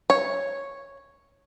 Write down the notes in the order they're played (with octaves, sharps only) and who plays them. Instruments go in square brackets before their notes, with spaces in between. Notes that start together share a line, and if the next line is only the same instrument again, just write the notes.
[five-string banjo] C#5